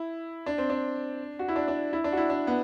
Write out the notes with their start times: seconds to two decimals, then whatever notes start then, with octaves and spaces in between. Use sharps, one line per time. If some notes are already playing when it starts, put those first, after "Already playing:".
Already playing: E4
0.46 D4
0.58 C4
0.70 D4
1.39 F#4
1.48 E4
1.56 D4
1.68 D4
1.93 E4
2.04 D4
2.12 F#4
2.17 E4
2.30 D4
2.47 B3